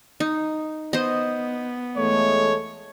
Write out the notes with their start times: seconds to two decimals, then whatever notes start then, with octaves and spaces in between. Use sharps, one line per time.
0.20 D#4
0.93 B3 C5 D#5
1.97 E2 G#3 A3 C#5